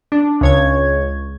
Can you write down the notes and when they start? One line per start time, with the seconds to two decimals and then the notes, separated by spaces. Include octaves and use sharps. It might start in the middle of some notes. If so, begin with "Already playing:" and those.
0.12 D4
0.41 C#2 C#5 G#6